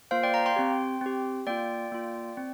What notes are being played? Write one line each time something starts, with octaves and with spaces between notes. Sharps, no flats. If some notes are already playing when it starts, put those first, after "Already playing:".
A#3 F4 C5 F5
D5 G5
F5 A#5
G5 C6
C4 G4
C4 G4
A#3 F4 D5 G5
A#3 F4
C4